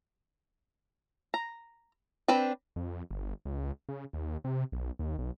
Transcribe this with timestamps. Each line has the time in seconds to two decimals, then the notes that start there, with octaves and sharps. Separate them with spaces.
1.34 A#5
2.28 C4 D4 B4 G5
2.76 F2
3.11 G1
3.46 C#2
3.89 C#3
4.13 D#2
4.44 C3
4.72 B1
4.99 D#2
5.18 B1